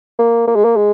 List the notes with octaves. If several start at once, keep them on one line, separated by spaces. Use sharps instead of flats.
A#3
A#3
G#3
A#3
G#3